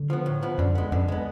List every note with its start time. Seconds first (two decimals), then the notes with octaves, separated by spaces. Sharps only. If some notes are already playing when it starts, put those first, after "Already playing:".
Already playing: D3
0.10 F3 B3
0.26 A2
0.43 F3 B3
0.58 F#2 D3
0.75 G#3 B3
0.92 F#2 D3
1.08 G#3 B3